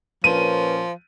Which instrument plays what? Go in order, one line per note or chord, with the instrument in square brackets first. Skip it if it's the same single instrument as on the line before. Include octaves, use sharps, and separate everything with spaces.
[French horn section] A#2 C#4 A#4 [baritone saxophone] F3 [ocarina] B4 [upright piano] D#7